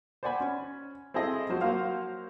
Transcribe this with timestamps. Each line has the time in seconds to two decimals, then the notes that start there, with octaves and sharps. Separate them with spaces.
0.23 C5 D5 F#5 G#5 B5
0.40 C#4
1.14 C4 E4 G#4 A4 D#5
1.49 F3 F#3 C5
1.61 F#3 A#3 C5 F5